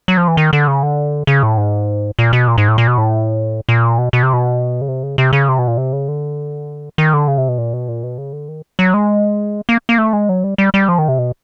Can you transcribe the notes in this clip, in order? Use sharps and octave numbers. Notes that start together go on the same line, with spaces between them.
F#3
F3
E3
D#3
D3
C#3
D3
C#3
A2
G#2
A#2
B2
A#2
G#2
A2
A#2
B2
A2
A#2
B2
B2
C3
B2
C#3
C3
C#3
C3
C#3
C3
B2
A#2
C3
C#3
D3
D#3
D3
C#3
C3
B2
A#2
B2
A#2
B2
C#3
D3
D#3
F#3
G#3
A#3
A#3
A3
G#3
F#3
G3
G3
G3
F3
D#3
C3
B2